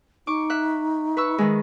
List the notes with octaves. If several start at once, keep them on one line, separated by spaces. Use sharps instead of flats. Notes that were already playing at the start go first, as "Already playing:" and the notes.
D#4 C#6 D6
E5 F#6
B4 C#6 E6
D#3 G#3